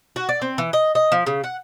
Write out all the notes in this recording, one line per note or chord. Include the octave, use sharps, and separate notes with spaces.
F#4
D5
C4
E3
D#5
D#5
F3
C#3
F#5